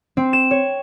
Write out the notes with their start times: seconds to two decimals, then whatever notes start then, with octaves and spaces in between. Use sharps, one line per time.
0.17 C4
0.33 E7
0.51 C#5